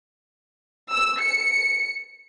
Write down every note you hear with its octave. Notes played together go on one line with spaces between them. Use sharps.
E6
C#7